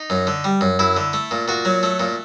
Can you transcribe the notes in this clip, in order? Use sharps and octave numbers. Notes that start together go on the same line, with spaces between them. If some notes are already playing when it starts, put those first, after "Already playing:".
Already playing: D#4
F#2
D3
G3
F#2
F#2 E4
D3
A3
A#2
A#2 F#4
F#3
A3
A#2